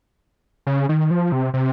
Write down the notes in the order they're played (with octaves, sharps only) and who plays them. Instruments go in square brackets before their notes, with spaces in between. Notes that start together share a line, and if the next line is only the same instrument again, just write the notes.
[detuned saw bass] C#3
D#3
F3
C3
C3